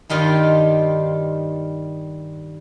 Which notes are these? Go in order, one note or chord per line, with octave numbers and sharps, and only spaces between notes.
G2 D#3 G3 F4